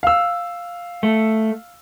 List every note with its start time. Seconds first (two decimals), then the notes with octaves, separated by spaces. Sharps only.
0.03 F5 E6
1.03 A3